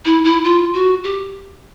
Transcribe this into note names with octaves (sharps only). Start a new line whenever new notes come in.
E4
E4
F4
F#4
G4